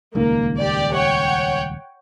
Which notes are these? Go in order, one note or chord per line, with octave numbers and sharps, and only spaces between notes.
D#1 C#2 D#3 A#3
G4 D5
C#5 F#5 G5